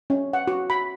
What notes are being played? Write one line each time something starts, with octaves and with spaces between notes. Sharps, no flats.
C#4
F#5
F#4
B5